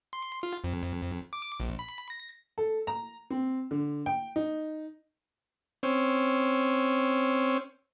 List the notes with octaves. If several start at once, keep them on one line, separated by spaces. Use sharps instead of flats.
C6
F4
F2
D6
A#1
B5
A#6
A4
A#5
C4
D3
G5
D#4
C4 C#4